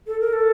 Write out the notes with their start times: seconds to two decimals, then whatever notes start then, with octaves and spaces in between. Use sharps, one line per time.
0.07 A4
0.20 A#4
0.33 A4